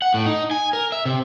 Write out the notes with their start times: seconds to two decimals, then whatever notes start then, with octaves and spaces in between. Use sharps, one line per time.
0.02 F#5
0.14 A2
0.26 D#4
0.51 G#5
0.73 A#4
0.92 E5
1.05 C3